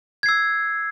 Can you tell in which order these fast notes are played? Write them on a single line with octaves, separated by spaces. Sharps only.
G#6 C7 E6